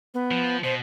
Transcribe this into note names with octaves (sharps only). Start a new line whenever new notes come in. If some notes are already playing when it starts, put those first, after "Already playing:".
B3
F3
B2 C5